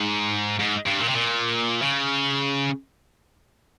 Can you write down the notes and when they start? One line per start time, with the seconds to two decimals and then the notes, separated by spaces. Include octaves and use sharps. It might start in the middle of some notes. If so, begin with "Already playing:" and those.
Already playing: G#2
0.59 G#2
0.86 G2
0.99 A#2
1.08 C3
1.15 A#2
1.82 C#3